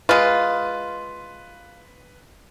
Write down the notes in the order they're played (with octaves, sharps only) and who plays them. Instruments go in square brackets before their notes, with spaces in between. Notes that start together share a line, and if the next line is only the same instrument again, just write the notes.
[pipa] G#3 F4 [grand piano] B4